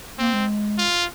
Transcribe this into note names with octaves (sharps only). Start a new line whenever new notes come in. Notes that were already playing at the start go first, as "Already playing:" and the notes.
A#3 C4
G#3
F4